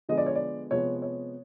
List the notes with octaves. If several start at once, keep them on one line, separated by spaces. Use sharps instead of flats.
D3 F3 G#3 B3 D#5
D5
C#5
D5
C3 F3 G#3 B3 C#5
C#5